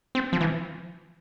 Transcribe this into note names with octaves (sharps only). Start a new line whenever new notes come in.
C4
F3
E3